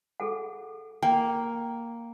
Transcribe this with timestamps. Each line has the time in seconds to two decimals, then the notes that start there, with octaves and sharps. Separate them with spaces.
0.20 G#4 A4 F#5
1.03 A#3 G5